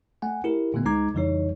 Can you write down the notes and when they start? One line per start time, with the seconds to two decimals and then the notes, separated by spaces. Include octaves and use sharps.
0.22 A3 F#5 G#5
0.44 E4 G4 A#4
0.74 A#2 D3 G3 A3 B3
0.85 C#2 G#3 D#4 A#5 D6 G#6
1.14 F2 C#3 E3 G3 D#4 C#5